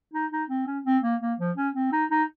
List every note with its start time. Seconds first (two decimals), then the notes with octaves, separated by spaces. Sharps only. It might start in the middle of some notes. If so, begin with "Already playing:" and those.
0.14 D#4
0.32 D#4
0.49 C4
0.67 C#4
0.86 C4
1.03 A#3
1.21 A#3
1.39 F3
1.57 C#4
1.75 C4
1.92 D#4
2.11 D#4